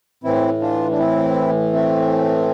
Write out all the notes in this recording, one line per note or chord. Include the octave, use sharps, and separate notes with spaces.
A2 E3 C4 E4
D4 F4
D4
C4 E4
A3 C4